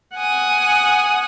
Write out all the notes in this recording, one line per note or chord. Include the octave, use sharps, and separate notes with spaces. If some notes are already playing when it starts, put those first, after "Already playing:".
F#5 G#5 D#6